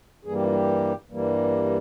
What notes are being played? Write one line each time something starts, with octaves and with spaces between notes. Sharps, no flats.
G2 E3 G3 A#3 G#4
G4
F4
G4
G2 E3 G3 A#3